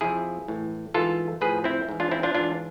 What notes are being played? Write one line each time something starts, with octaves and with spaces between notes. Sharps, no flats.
F2 C3 F3 E4 G#4
A2 E3
G#2 E3 F4 A4
A2 F3 G#4 B4
C4 E4
G#2 E3
D4 F4
C4 E4
D4 F4
G#2 E3 D4 F4